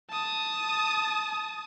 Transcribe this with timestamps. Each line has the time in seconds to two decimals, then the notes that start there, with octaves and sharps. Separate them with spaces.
0.10 A5 D#6